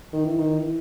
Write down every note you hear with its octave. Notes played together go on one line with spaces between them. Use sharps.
D#3
E3
D#3
E3